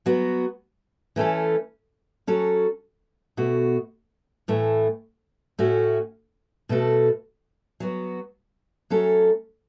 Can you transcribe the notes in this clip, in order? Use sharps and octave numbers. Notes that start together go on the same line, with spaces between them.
F#3 B3 F#4
E3 A3 C#4 A4
F#3 C#4 F#4 A4
B2 A3 F#4
A2 E3 A3 E4
A2 A3 C#4 F#4
B2 A3 F#4 A4
F#3 B3 F#4
F#3 A3 C#4 A4